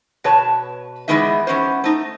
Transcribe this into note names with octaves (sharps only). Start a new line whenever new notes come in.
B2 B4 C#5 A5
E3 G3 G#3 B3 D#4 E5
E3 B3 C#4 C5
A3 D#4